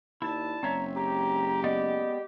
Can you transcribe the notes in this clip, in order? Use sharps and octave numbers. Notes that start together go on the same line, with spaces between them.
D#2 D4 E4 A5
F#1 C4 C#5 E5 A#5
G#3 G4 A#5
B3 D5 D#5